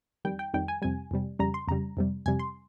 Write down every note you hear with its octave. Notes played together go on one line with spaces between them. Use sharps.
F2 D#3 G3 G5
G5
F2 D#3 G3 G5
G#5
F2 C3 G3 G#5
F2 C3 G3
F2 C#3 G3 A#5
C6
F2 C#3 G3 A#5
F2 C3 G3
F2 C3 G3 G#5
C6